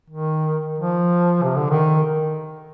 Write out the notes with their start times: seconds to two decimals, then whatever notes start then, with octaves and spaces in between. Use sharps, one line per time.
0.10 D#3
0.78 F3
1.43 C3
1.57 D3
1.70 D#3